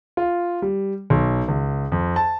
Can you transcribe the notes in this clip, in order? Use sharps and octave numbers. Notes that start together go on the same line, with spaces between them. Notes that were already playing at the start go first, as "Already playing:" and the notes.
F4
G3
B1
C#2
F2
A5